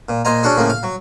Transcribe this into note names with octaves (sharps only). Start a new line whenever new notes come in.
A#2
A#2 C5 D#5 G#5 A#5
C#4 D4 F#4 G#4
A2 C#3 F3 A#3
F5
F#3